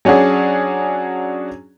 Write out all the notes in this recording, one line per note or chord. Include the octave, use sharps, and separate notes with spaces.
F#3 C#4 D4 F#4 G#4